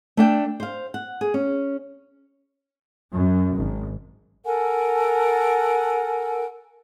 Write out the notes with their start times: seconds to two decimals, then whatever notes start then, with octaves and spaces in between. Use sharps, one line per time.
0.17 A3 D4 G5
0.60 C5 F5
0.94 F#5
1.21 G#4
1.34 C#4
3.13 F#2
3.57 G#1
4.45 A4 A#4 F#5 G#5